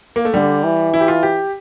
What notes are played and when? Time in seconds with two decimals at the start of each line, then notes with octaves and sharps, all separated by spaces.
0.16 A#3
0.25 A3
0.34 D3 G3
0.64 E3
0.94 E4
1.00 G4
1.08 F4
1.23 G4